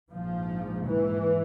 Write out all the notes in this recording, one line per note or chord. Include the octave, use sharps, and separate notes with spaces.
A#1 G#2 F3
E3